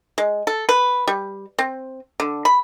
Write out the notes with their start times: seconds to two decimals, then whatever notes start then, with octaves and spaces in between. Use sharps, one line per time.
0.18 G#3
0.47 A4
0.69 B4
1.08 G3
1.59 C4
2.20 D3
2.45 B5